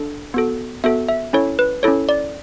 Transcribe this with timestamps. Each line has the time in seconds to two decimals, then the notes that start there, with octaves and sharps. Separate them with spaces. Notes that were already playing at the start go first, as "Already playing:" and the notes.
Already playing: D4 A4
0.34 B3 F#4 A4
0.84 B3 F#4 A4 E5
1.09 E5
1.33 C#4 E4 A4 C#5
1.59 B4
1.83 C#4 E4 A4 C#5
2.09 D5